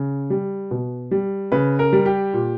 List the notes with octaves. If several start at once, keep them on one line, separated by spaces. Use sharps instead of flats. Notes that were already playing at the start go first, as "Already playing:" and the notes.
Already playing: C#3
G3
B2
G3
C#3 B4
A#4
G3
G4
A#2